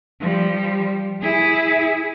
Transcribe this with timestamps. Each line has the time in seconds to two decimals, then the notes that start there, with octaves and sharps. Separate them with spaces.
0.21 F3 G3
1.22 E4 G#4